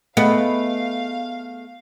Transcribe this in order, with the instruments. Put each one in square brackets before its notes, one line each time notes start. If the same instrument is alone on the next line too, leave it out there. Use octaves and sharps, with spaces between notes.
[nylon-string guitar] A3 G#4 D#5 [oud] B3 [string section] F5